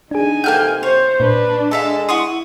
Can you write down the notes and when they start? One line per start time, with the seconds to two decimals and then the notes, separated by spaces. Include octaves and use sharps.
0.11 D4 D#4 G#4 G#5
0.44 C3 A#3 A4 F#5 G5 F6 G6
0.83 C5 C#5
1.20 A#2 D4 B4
1.71 G#3 A4 E5 F5
2.09 E4 F#5 C6 C#6 D#6